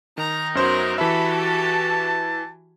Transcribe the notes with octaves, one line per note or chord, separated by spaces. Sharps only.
D#3 D#4 A#5
F#2 F#3 B3 A#4 C5 C6
E3 F#4 G4 A4 E5 B5
A5